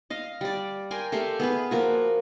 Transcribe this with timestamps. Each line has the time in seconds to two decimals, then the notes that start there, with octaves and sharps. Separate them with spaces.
0.10 D#5 F5
0.41 G3 D5
0.91 A#4 G5 G#5 C6
1.12 A3 G4 F5 C6
1.40 B3 G#4 B4
1.71 F3 A#3 F#4